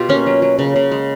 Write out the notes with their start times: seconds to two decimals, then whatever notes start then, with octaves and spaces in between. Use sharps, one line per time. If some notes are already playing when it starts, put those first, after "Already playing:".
Already playing: B2 F4 G4
0.09 A#3 C#4
0.26 F#3
0.42 F#3
0.59 C#3
0.76 C#3
0.91 G#3